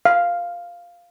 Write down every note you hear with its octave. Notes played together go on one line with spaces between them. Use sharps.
F5